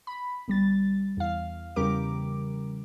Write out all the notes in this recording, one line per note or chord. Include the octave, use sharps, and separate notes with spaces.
B5
G1 G3 A6
E2 F5
E2 C#3 G3 G4 A#4 D6